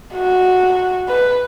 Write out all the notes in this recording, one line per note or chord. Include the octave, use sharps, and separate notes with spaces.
F#4
B4